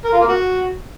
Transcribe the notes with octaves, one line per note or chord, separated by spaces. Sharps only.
A#4
F4
A#3
F#4